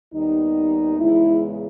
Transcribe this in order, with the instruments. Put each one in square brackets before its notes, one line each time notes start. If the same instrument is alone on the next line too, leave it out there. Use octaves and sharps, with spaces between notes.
[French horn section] D#2 D#3 G3 B3 D#4
E2 C#3 G#3 E4